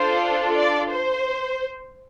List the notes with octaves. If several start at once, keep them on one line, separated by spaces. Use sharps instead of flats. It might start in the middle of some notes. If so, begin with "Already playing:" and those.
Already playing: D4 F4 A4 C5
D5
C5